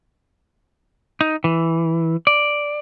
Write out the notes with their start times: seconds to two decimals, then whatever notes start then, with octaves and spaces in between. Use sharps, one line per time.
1.21 D#4
1.44 E3
2.27 D5